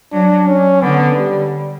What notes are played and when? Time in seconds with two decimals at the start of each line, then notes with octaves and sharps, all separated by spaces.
0.13 F#3 D4
0.47 C#4
0.82 D3 B3
1.17 G3